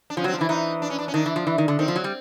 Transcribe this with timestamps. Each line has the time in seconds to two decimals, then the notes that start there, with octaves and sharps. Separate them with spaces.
0.10 D4
0.17 F3 C#4
0.24 F#3
0.28 C4
0.34 F3
0.38 E3 D4
0.49 E3 D#4
0.82 D4
0.90 C#4
0.99 D4
1.08 C#4
1.14 D#3 D4
1.26 E3
1.36 F3
1.47 E3
1.58 D#3
1.68 D3
1.79 D#3 C4
1.88 F3
1.96 F#3
2.04 G3